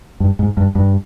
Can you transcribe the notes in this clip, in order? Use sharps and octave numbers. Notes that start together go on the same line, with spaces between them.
G2
G#2
G2
G2